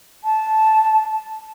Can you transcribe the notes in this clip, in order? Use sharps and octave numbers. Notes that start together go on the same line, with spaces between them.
A5